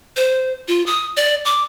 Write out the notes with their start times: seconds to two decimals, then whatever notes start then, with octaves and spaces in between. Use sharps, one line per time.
0.17 C5
0.68 F4
0.86 D#6
1.17 D5
1.45 D6